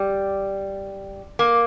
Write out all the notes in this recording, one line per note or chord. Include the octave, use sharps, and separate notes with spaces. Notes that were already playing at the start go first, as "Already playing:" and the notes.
Already playing: G3
A#3